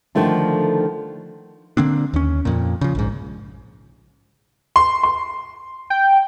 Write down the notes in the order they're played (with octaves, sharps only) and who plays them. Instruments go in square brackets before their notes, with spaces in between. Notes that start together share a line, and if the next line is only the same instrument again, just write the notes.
[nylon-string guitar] D3 D#3 F3 A3 D4
[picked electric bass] D3 A#3 C4 D4
D#2 C#4
F2 A#2
C#3 F3
A#1 G#2
[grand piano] C6
C6
[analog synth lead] G5